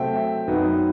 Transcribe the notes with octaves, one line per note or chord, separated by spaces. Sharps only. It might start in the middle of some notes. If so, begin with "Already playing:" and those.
Already playing: C3 F#3 A3 C4 E5 G5
F#2 F#3 B3 D#4